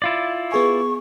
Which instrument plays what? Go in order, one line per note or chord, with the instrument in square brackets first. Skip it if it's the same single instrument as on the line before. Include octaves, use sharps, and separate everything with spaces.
[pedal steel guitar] E4 F4 D5
[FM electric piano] B3 G#4 G#5 [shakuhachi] C#6